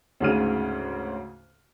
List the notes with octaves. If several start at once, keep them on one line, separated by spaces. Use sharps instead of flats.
D2 G#2 C#3 F#4 F6 D#7